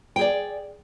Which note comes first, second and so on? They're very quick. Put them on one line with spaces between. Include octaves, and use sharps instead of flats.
G5 G#4 D5